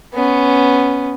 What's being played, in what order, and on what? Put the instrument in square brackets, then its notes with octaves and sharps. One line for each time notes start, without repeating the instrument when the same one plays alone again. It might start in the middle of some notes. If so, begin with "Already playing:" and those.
[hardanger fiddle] B3 C#4